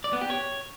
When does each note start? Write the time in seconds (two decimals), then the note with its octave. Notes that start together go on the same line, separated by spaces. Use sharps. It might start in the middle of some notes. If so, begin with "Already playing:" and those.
0.04 D5
0.13 B3
0.21 G4
0.30 C#5